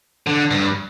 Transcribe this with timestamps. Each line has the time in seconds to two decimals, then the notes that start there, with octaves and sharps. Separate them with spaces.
0.27 D3
0.51 G2